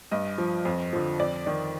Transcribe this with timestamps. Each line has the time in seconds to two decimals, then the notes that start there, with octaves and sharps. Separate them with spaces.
0.11 G2 D#5
0.38 F3
0.65 F2
0.93 D3 F3
1.19 F2 D5
1.46 D#3 D5